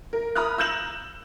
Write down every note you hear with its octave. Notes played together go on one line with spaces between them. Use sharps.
A#4
A#5 B5 D#6 F6 F#6
E6 F#6 G6 A#6 E7 F#7